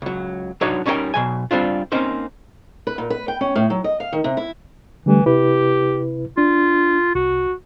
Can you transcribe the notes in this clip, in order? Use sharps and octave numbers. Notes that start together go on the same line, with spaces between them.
C#2 F#3
F#3 D4 D#4 F#4 C#5 F#5
G3 C#4 D#4 E4 A#4 G5
B2 F#3 G#5
G3 C4 D4 F4
A#3 C4 C#4 D#4 C5
B4
A#2
B4
G5
C#4
A2
F#3
D#5
F5
D#3
C3
E4
D3 E3 G3 A3
C3 E4 G4 B4
D4 F4
C2 F#4